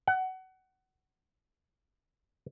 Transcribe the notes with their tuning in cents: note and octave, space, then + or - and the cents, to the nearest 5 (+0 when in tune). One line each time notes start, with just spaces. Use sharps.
F#5 +25